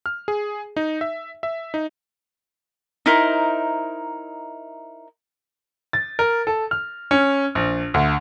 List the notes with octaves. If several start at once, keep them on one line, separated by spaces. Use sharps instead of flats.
F6
G#4
D#4
E5
E5
D#4
D#4 E4 A#4 C5
A6
A#4
A4
F6
C#4
A#1
D2